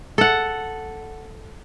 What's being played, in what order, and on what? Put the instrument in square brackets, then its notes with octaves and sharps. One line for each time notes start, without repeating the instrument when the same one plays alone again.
[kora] A4 F#5